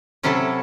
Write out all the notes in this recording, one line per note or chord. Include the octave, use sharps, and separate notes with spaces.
C3 F#3 C#4 E4 A4